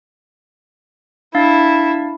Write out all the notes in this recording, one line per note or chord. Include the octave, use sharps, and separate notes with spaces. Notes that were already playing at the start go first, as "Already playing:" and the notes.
D4 E4 F5 A6